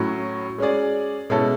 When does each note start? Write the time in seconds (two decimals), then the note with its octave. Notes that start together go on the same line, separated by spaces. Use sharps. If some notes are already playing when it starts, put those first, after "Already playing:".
Already playing: A2 F#3 C#4
0.58 G#3 C#4 G#4 D5
1.30 B2 G#3 C#4 E4 A4